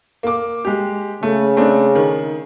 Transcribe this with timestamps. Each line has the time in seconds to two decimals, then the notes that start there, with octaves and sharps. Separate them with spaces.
0.23 A#3 D6
0.65 G#3 G4
1.23 C#3 A3
1.56 A3 C4 D4
1.95 D#3